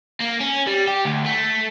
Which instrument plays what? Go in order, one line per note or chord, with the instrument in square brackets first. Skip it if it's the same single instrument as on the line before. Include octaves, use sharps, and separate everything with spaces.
[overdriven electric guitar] A#3
C#4
G3
G4
D2
A3